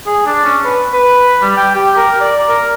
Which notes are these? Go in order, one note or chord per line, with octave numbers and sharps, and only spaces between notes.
G#4
D4
C#4
B4
B4
G3
G5
G4
A#4
D5
A#4